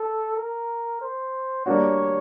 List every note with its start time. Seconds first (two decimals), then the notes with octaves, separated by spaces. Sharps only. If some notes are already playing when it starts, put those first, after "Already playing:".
Already playing: A4
0.37 A#4
1.01 C5
1.66 G3 A#3 D4 F#4 C#5